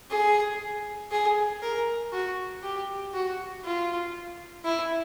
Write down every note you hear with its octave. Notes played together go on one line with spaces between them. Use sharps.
G#4
G#4
A#4
F#4
G4
F#4
F4
E4